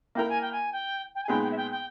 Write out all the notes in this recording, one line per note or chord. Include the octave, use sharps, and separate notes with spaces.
A#3 E4 A#4 G5
G#5
G5
G#5
G5
G5
G#5
A#2 G#3 B3 D#4 G#4 G5
G5
E5
G5
G5